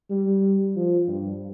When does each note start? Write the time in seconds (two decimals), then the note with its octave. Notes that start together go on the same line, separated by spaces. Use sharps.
0.10 G3
0.76 F3
1.08 G2